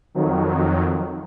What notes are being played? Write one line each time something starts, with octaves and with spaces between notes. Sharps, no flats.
F2 D#3 F#3